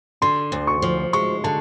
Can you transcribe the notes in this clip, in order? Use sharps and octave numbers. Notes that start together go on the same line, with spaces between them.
D3 C6
D2
C#6
F3
G#3 C#6
D3 A5